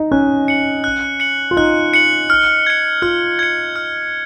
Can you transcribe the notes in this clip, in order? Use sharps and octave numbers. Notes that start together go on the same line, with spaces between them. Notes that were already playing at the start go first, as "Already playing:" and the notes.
Already playing: D#4
C#4 F#6
C#7 F#7
F#6
C#7 F#7
F4
D#4 F#6
C#7 F#7
F6
G#6 C#7
F4 F6
G#6 C#7
F6